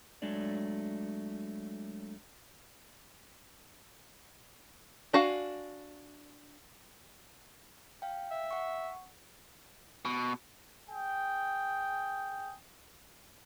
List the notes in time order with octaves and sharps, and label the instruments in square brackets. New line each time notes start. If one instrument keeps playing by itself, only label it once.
[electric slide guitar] F#3 G#3 A3 D4 D5
[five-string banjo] D4 F#4 F5 G#5
[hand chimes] F5 G5
[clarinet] E5
[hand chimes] F#5 C#6
[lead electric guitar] B2
[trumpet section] G#4 G5